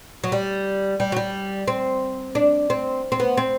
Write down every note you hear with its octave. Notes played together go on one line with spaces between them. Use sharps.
F#3
G3
G3
F#3
G3
C4
D4
C4
C4
B3
C4